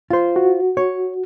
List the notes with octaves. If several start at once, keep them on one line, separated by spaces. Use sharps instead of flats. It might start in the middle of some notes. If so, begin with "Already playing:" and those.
F4 C5
F#4
C#5